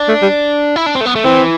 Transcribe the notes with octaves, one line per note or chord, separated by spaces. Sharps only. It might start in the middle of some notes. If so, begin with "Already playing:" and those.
Already playing: D4
A3
G3
E4
D4
C4
A3
B3
A3
E3 C4